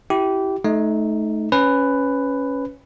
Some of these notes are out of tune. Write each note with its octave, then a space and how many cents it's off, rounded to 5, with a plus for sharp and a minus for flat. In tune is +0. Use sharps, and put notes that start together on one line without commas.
E4 +0 G4 -20
A3 -25 D#4 +0
C#4 +0 B4 +10